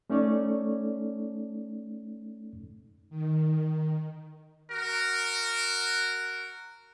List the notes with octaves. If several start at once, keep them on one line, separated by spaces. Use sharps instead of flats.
A3 C#4 D#4 A4 C#5 D5
D#3
F#4 A#4